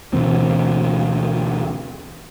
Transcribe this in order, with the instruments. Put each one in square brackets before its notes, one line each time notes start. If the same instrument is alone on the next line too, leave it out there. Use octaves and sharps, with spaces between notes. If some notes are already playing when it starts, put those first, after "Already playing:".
[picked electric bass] D2 B2 E3 C4